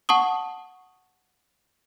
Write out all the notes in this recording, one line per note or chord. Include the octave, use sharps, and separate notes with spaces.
F#5 A5 C#6 D#6